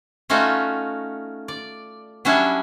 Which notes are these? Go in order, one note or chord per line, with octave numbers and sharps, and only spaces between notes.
A3 C#4 D#4 F4 F#4
D5
F#3 G3 C#4 D4 E4 C#5